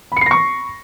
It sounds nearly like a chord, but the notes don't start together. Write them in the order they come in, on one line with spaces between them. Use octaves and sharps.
B5 C#7 C7 A#6 C#6